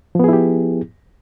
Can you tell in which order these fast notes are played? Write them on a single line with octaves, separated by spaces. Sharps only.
F3 B3 G#4 E4 G4